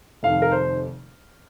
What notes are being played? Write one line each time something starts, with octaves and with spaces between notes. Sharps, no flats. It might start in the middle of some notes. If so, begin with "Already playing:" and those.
F1 F2 D#3 F5
A#4
C5